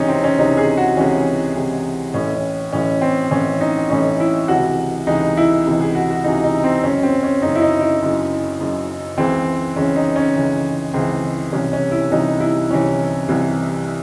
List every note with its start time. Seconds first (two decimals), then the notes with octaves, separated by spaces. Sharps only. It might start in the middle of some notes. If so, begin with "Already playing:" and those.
Already playing: C#2 C3 E3 C#4 D#4
0.09 C4
0.24 C#4
0.38 C#2 C3 E3 D#4
0.57 G#4
0.77 F#4
0.97 C#2 C3 E3 C#4
1.56 C#2 C3 E3
2.14 A1 A2 E3 C#4
2.34 C#4
2.72 A1 A2 E3 C#4
3.01 C4
3.31 A1 A2 E3 C#4
3.61 D#4
3.90 A1 A2 E3 C#4
4.20 E4
4.48 C#2 C3 E3 F#4
5.07 C#2 C3 E3 D#4
5.37 E4
5.66 C#2 C3 E3
5.81 G#4
5.95 F#4
6.10 F#4
6.24 C#2 C3 E3 D#4
6.44 D#4
6.64 C4
6.83 F#1 F#2 C#3 C#4
7.03 C4
7.23 C#4
7.42 F#1 F#2 C#3 D#4
7.55 E4
7.62 D#4
7.81 E4
8.01 F#1 F#2 C#3
8.59 F#1 F#2 C#3
9.18 C#2 C#3 E3 C4
9.76 C#2 C#3 E3 C#4
9.96 D#4
10.16 C#4
10.36 C#2 C#3 E3
10.94 C#2 C#3 E3 C4
11.52 C2 C3 E3 C#4
11.73 C#4
11.91 E4
12.11 C2 C3 E3 D#4
12.40 E4
12.70 C2 C3 E3 C#4
13.29 C2 C3 E3